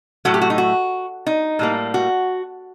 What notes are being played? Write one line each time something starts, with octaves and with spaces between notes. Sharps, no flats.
A2 F#3 A3 F#4
G4
F#4
D#4
F#4
D#4
A2 G3 A#3
F#4